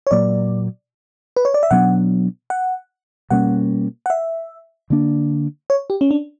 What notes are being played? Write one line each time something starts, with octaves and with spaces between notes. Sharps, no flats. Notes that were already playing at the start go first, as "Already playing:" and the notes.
C#5
A#2 F#3 A#3 D5
B4
C#5
D5
E5
B2 F#3 B3 D4 F#5
F#5
B2 G3 A#3 C#4 F#5
F#5
E5
D3 A#3 D4
C#5
G4
C#4
D4